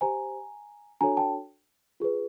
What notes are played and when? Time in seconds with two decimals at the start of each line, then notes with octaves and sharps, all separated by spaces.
0.01 G4 C5 G#5 A#5
1.01 D4 F#4 A4 C#5 G#5 A#5
1.17 G5 A5
2.00 F4 G#4 B4